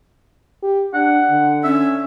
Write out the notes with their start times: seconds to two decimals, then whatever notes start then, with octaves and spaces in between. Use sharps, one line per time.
0.63 G4
0.94 D4 F#5
1.31 D3
1.64 C#4 E5